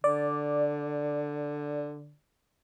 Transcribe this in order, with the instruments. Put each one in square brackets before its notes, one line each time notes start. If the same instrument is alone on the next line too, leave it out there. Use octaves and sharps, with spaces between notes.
[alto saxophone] D3 [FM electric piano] D5